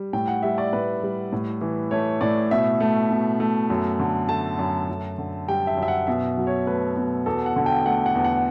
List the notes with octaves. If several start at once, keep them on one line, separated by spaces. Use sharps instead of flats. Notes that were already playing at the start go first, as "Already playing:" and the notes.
Already playing: G3
A2 G5
F#5
G3 E5
D5
A2 B4
G3
A2
E3
A3 C#5
A2 D5
B2 E5
A3
B2
A3
F#2
D3
A3 A5
F#2
F#2
D3
G3 G5
E5
F#2
E5
F#5
B2 E5
F#3
C#5
A3 B4
B2
E2 A4
F#5
D3
G5
A3 F#5
F#5
E2
F#5